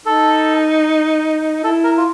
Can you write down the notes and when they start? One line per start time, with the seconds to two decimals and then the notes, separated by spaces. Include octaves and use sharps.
0.06 D#4 A4
1.64 E4 A4
1.84 A#4
1.97 F4